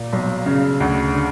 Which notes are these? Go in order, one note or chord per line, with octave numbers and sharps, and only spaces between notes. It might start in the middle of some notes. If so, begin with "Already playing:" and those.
Already playing: A#2
B1
C#3
D2
D3